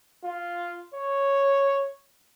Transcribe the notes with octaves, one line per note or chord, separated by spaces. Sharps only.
F4
C#5